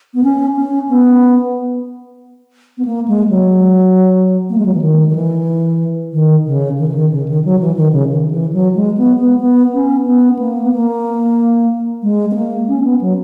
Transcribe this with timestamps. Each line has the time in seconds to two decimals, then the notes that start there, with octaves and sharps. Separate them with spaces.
0.14 B3
0.24 C#4
0.57 C#4
0.89 B3
2.78 B3
2.85 A#3
3.08 G#3
3.29 F#3
4.50 A#3
4.58 G#3
4.66 F#3
4.74 E3
4.81 D#3
5.09 D#3
5.15 E3
6.13 D#3
6.46 C#3
6.78 D#3
6.88 E3
6.94 D#3
7.12 C#3
7.28 D#3
7.45 F#3
7.60 E3
7.77 D#3
7.93 C#3
8.10 D#3
8.31 E3
8.53 F#3
8.75 G#3
8.97 B3
9.19 B3
9.40 B3
9.74 C#4
10.06 B3
10.39 A#3
10.63 B3
10.72 A#3
12.03 G#3
12.31 B3
12.35 A#3
12.68 C#4
12.84 B3
13.01 F#3